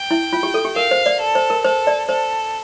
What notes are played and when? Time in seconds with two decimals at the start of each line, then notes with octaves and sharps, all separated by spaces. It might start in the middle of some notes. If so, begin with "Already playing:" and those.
Already playing: G5
0.11 E4
0.33 F4
0.43 G4
0.54 A4
0.65 G4
0.76 A#4 F5
0.91 C5
1.06 D5
1.20 A4
1.35 C5
1.50 A#4
1.65 A4 C5
1.87 D5
2.08 A4 C5